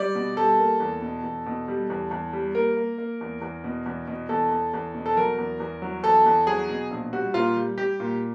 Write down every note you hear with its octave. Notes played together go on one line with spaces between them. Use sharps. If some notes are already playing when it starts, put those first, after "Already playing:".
Already playing: G3 D5
B2
G3 A4
A#3
E2
B2
E2
B2
G3
E2
E2
G3
A#3 A#4
A#3
A#3
E2
E2
B2
E2
B2
E2 A4
E2
E2
B2
A4
F#3 A#4
E2
E2
F#3
E2 A4
E2
F#3 G#4
B2
A#1
G3 F#4
A#2 F4
G3
G3 G4
A#2